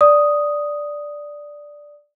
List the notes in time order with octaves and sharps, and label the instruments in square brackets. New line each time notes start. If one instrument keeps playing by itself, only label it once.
[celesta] D5 D#6